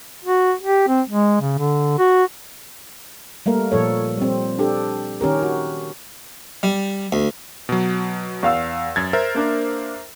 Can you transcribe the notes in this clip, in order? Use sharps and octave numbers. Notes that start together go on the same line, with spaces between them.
F#4
G4
C4
G#3
C#3
D3
F#4
G3 A3 A#3 A#4
A#2 F3 A4 C#5
G3 C4
D4 G4 A4
D#3 C#4 G4 A#4
F#4
G3
D2
B2 F#3
E2 F5 E6
F#2 G#6 A6
A#4 C5 E5
A#3 D4